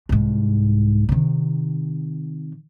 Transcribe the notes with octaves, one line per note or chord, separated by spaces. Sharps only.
C2 G#2
C3 D#3